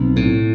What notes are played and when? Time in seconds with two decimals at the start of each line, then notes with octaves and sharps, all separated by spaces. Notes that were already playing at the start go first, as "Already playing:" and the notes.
Already playing: B1 C4
0.16 A2